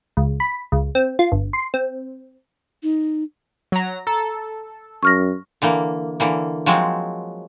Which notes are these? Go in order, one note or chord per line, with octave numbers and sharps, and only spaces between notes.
C#2
B5
C#2
C4
F4
G1
C6
C4
D#4
F#3 A#5
A4 A#5
F#2 C#6 F6 A#6
D3 E3 A#3
D3 E3 A#3
F3 F#3 G#3 C4